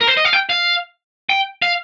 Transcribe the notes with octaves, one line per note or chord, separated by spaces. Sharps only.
A#4
C5
D#5
F5
G5
F5
G5
F5